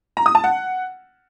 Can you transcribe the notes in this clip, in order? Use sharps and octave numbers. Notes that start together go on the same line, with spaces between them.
A#5
D#6
A5
F#5